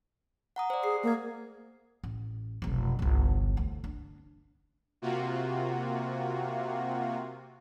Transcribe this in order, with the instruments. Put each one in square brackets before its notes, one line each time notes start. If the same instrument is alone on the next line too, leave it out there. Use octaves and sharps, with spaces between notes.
[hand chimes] F#5 A#5 D#6
C5 D5
[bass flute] G#4 [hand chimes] C7
[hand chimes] A3 G#6 [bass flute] A#3
[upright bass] A1
F1 B1
G1 C2
D2
D4
[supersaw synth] C3 A#3 F4 F#4